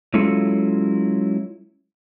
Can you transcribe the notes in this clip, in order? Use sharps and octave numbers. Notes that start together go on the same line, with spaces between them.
F#3 G#3 C#4 E4 F4 A4